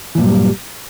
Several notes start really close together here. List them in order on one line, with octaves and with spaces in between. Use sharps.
E3 A#2 G2 F#3 G3